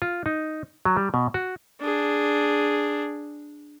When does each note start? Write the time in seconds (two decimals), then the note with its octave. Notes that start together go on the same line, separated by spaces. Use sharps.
0.02 F4
0.26 D#4
0.85 F#3
0.97 G3
1.14 B2
1.34 F#4
1.82 D4 G#4